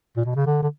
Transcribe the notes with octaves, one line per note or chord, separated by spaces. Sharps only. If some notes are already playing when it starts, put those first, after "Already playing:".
A#2
B2
C#3
D3
D3